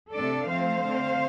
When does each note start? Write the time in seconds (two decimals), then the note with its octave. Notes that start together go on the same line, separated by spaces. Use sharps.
0.13 C3 A3 D4 A4 D5
0.48 F3 A3 C4 C5 F5
0.83 D3 A3 C4